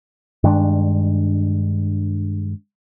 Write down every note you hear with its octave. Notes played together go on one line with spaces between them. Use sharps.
G2 D#3 G#3 D4